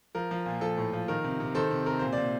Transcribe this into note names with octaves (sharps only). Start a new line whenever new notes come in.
F3 A#4
F3
A#2
F3 A4
A2
F3
D#3 A#4
C3
C3
D#3 A4 C5
C3
C3 A#4
A#2 C5
D5
A#2